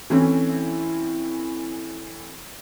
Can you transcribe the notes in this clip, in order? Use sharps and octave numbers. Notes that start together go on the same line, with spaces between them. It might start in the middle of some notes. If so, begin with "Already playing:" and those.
E3 A3 C4 C#4 E4